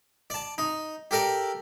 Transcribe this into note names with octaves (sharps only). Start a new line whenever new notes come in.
D5 A5
D#4
G4 A4 A#4 D5